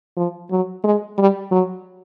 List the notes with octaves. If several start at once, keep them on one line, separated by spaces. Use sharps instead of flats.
F3
F#3
G#3
G3
F#3